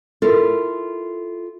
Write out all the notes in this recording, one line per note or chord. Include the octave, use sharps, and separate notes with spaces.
E4 F4 A4 A#4